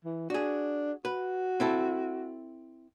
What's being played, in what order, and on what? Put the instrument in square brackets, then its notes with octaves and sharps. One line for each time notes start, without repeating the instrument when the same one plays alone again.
[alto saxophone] E3
[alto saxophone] D4 [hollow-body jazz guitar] F#4 G#4
[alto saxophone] F#4 [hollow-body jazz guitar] B4
[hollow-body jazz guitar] C4 E4 A4